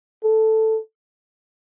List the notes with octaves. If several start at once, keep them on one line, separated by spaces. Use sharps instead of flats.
A4